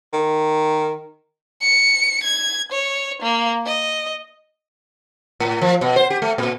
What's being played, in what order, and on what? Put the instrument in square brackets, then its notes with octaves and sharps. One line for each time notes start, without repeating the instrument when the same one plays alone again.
[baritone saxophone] D#3
[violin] C#7
G#6
C#5
A#3
D#5
[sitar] A2
F3
B2
C5
G4
A3
A#2